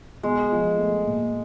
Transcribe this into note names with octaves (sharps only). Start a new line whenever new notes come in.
B1 G#3
F3
A3
A#2